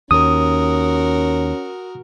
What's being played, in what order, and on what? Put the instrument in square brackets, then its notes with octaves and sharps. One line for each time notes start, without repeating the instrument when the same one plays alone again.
[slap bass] D#2 [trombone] C#4 [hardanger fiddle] F#4 A#4 [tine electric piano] D#6